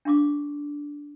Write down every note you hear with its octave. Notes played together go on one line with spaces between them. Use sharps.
D4 F5 C#6 D6